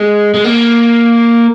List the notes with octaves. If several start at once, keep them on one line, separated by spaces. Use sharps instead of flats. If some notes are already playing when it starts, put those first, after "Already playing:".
Already playing: G#3
G#3
A#3